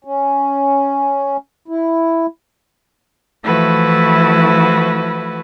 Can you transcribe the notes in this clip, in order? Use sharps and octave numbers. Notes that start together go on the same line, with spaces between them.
C#4
E4
E3 F3 A3 E4 F#4 B4